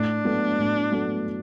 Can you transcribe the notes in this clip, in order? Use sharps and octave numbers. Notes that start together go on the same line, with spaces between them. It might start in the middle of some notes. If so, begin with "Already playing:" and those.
Already playing: A2 D4
F#3 B3 F#4 A4
A2
F#3 B3 F#4 A4